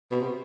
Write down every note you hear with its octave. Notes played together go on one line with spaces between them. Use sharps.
B2
C3